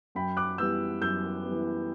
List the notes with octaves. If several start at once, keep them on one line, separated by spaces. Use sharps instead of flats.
F#2 G5 B5
D6 F#6
E3 G3 B3 E6 G6
F#2 E6 G6
E3 G3 B3